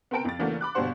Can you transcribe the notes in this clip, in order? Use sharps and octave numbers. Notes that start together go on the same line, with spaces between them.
B3 C4 A#4 G5 A5 D7
F2 A6
C#3 E3 A3 A#3 D4 F#4
B5 D6 F#6
G1 B2 D4 G4 C5 F#5